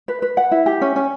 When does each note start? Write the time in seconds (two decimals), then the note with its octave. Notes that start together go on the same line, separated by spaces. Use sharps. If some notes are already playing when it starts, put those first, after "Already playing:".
0.08 B4
0.22 B4
0.37 F#5
0.51 E4
0.66 G4
0.81 C#4
0.96 C#4